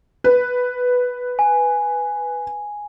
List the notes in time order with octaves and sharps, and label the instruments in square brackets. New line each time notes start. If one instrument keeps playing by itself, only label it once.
[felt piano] B4
[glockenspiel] G#5